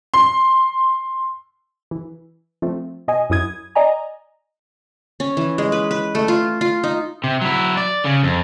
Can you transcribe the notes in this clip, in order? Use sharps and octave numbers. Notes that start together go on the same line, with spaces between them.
C6
E3
F3 A3 C4
B2 D#5 G#5
F#2 F#3 E4 D#6 G#6
D5 D#5 G#5 A#5
C#4
E3
G#3
B4
B4
A3
F4
F4
D#4
C3
F#3 E4
D5
C#3
F2